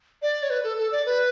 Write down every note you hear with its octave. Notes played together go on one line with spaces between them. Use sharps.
D5
C#5
B4
A4
A4
D5
B4